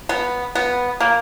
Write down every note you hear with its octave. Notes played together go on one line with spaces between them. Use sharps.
B3
B3
A#3